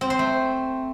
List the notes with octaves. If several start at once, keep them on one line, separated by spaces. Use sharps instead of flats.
C4
C5
A3